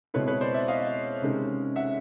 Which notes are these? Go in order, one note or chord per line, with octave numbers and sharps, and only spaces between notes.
B2 G#3 C4 E4 B4 C#5
B4 C#5
C5 D5
D5 E5
D#5 F5
C3 D#3 G#3 C#4
E5 F#5